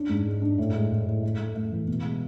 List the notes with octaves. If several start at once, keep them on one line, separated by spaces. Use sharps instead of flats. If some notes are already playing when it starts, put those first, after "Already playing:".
Already playing: C#4 D4
G#2
G#3
D4
A2
G#3
A2
A2
A3
A3
A3
E3
B2
G#3